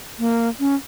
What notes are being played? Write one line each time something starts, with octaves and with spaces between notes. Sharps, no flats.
A#3
C#4